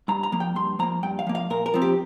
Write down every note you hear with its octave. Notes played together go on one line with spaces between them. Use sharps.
G2 A#5
A#5
F3 A#3
G5
G2 C6
F3 A#3 A#5
G2 G5
F5
F3 A#3
F5
A#2 A#4
A#4
F3 C4
G4